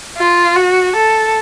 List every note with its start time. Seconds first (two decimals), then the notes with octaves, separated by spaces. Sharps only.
0.17 F4
0.56 F#4
0.96 A4